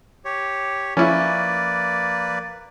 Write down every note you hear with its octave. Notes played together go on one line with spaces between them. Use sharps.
G4 C#5
F3 A#3 C#4 E4 B4 D5